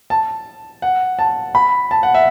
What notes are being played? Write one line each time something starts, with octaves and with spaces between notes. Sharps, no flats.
A5
F#5
A5
B5
A5
F#5
E5